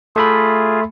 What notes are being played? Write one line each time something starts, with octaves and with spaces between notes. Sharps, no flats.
A3 F4 G#4 E5 B5